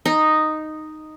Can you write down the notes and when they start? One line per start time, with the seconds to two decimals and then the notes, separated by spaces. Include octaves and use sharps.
0.06 D#4